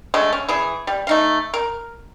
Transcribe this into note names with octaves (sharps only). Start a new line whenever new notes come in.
D3 G#3 A3
C#4
E3 G#4
G3
A3 D#4 F5
A#4